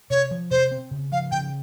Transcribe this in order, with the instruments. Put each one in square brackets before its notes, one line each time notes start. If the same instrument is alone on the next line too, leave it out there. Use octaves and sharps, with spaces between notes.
[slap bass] C3 [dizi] C#5
[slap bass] F3
[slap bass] C3 [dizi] C5
[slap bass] C4
C#3
[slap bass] F3 [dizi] F5
[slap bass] C#3 [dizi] G5